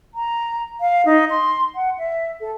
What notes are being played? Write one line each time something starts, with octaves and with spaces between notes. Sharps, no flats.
A#5
F5
D#4
C6
F#5
E5
A4